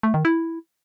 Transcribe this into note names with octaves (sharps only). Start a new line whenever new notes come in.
A3
D#3
E4